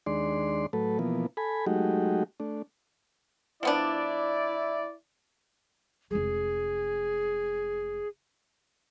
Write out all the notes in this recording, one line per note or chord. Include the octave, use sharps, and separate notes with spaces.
D#2 G#3 D4 D5 C6
A2 F#3 A3 A4 B4
B2 E3 F3 A#3 B3
A4 G#5 B5
F#3 G#3 A3 D#4 F#4 G4
A3 D4
F3 B3 D4 E4 D5
F1 G#3 G#4